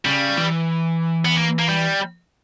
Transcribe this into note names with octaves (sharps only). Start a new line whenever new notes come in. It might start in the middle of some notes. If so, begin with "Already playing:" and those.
C#3 G3
E3
B3
A#3
A#3
G3